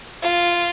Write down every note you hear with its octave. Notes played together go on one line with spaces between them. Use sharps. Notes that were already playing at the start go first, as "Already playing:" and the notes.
F4